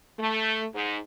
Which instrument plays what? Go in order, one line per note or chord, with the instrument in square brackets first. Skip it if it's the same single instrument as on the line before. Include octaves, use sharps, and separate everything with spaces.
[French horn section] A3
G#2